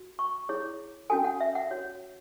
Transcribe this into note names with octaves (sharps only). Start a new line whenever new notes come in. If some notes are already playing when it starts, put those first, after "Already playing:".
Already playing: F#4
C#6
E4 G#4 C#5
C#4 F#4 A4 G#5
F#5
E5
F#5
F#4 C#5